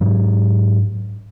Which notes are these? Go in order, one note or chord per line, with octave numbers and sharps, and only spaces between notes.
G#2 F#3